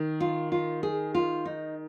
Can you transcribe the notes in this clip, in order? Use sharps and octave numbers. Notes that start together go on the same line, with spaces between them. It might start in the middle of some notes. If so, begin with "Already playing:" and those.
Already playing: D#3
F4
F4
G#4
F4
D#4